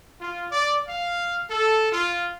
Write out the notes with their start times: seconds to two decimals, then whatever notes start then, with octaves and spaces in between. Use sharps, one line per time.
0.20 F4
0.52 D5
0.87 F5
1.49 A4
1.91 F4